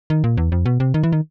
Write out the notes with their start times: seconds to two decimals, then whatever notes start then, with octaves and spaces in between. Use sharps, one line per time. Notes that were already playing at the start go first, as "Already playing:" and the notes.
0.10 D#3
0.24 A#2
0.37 E2
0.52 F2
0.66 B2
0.80 C3
0.94 D#3
1.03 E3
1.12 D#3